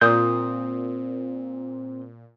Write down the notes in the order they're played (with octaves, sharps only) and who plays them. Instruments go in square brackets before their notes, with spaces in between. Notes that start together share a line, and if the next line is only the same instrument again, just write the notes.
[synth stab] A#2 [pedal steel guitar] C4 D#6 G6